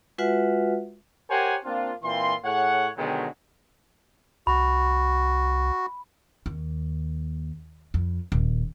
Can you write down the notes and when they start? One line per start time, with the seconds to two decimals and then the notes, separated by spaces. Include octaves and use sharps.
0.18 G#3 F4 F#4 B4 E5 F#5
1.30 G4 A#4 C5 C#5 F#5 G#5
1.64 A#3 C4 D4 F4
2.03 A#2 E3 C4 F4 C6
2.44 A2 G#4 C#5 F#5
2.97 B2 D3 D#3 F#3 G#3 G4
4.47 C2 F#4 B5
6.46 D#2
7.94 F2
8.32 D#1